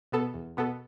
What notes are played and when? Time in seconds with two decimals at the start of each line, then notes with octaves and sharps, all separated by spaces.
0.12 B2 B3 A4
0.34 E2
0.57 B2 B3 A4